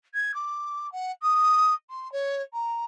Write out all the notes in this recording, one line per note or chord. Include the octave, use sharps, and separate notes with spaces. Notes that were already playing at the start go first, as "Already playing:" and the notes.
G#6
D6
F#5
D#6
C6
C#5
A#5